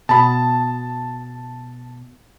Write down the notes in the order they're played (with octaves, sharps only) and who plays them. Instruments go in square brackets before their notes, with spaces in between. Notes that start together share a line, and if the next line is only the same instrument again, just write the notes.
[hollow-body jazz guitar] B2 B5 [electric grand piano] A5